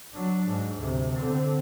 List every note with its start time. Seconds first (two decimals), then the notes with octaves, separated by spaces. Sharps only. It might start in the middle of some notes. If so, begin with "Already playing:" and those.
0.14 F#3 D4
0.48 G#2
0.78 D2 C3
1.17 D3 C4